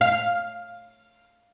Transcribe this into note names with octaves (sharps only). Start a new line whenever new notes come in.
F5